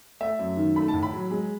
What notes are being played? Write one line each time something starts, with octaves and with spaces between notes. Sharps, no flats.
A3 E5
F#2
D#3
A3 B5
A5
A2
B5
F#3
G#3